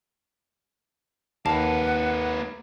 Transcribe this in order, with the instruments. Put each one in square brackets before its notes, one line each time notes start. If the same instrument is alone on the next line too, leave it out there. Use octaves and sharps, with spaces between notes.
[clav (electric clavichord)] D#2 [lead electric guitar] A#3 B4 [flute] F#5 [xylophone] A5